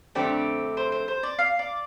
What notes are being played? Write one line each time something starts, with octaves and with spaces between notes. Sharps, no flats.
F2 D3 A3 C4 G4 D5
C5
C5
C5
D5
F5
D5